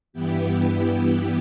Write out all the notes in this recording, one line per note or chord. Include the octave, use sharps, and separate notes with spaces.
G2 E3 B3 E4 G4